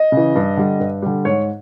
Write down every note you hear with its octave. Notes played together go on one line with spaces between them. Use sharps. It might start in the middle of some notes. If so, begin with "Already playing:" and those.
Already playing: D#5
C#3
E3
G2
D3 G3
G2
D3 G3
G#2 C#5